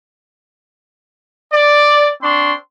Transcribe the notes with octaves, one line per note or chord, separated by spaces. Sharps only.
D5
C4 D4 C6 C#6